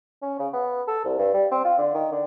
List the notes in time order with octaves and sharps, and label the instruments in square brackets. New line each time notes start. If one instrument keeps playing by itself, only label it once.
[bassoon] C#4
C#3
B3
A4
C2
G2
G3
C4
F4
D3
D#3
D3